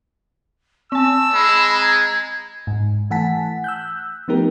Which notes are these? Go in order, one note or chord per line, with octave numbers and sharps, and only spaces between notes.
C4 G#5 A5 E6
G#3 B5
A#5 G#6
G#2
E3 A3 F#5 G#5 A5 B6
E6 F#6 G6
F3 A3 B3 D#4 G4 A#4